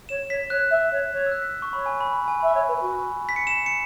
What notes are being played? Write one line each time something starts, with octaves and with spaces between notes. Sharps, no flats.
C#5 E7
C#5 B6
C#5 F#6
E5
C#5
C#5
E6
F#6
B6
C#6
C#5 B5
G#5
B5
B5
G#5
E5 B5
C#5
B4
F#4
B6
C#7
E7
C#7